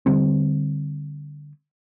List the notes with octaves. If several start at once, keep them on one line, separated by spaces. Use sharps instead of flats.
D3 G3 C4